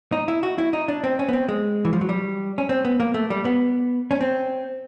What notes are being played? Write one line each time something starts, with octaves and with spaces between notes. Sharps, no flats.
D#4
E4
F#4
E4
D#4
D4
C4
C#4
B3
C4
G#3
E3
F3
F#3
G3
C#4
C4
B3
A#3
A3
G3
B3
C#4
C4